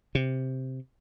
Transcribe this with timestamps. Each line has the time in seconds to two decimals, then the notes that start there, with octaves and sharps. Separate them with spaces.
0.15 C3